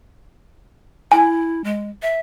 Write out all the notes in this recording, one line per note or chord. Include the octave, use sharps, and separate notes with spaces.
E4 G#5
G#3
E5